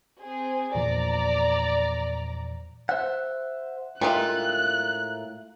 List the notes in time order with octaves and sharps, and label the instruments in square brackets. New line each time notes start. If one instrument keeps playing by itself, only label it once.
[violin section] C4 G#4
[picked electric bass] E2 A#2 F3 [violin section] D5 A#5
[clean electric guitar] C5 E5 F#5
[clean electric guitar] A2 A#4 E5 [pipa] G3 G#3 F4 [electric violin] F#6